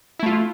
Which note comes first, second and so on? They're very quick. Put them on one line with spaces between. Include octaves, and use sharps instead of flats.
E4 A3 F4